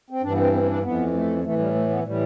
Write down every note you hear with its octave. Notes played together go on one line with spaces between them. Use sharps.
C4
G2 E3 D4
B3
C4
C4
C4
D4
F2 E3 B3
A3
A2 E3 A3
G3
A3
B3
A2 E3 G3